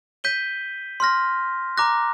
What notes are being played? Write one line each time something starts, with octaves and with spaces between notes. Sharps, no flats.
G6 B6 D#7 G7
C6 F6 A#6
A#5 D6 F#6 A#6